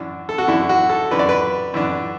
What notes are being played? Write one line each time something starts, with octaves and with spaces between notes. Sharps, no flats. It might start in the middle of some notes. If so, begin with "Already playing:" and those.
Already playing: F#2 E3 D4
A4
F#4
F#2 E3 D4 E4
F#4
A4
F#2 E3 D4 B4
D5
B4
F#2 E3 D4